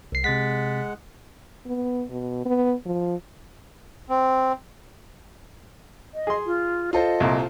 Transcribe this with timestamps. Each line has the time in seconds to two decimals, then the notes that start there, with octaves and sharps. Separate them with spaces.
0.12 C2 C7
0.24 C3 G#3 F#5 A6 B6
1.66 B3
2.10 B2
2.45 B3
2.85 F3
4.08 C4
6.14 D#5
6.27 G#4 C6
6.46 F4
6.93 F4 A4 C5 D#5
7.20 C2 A#2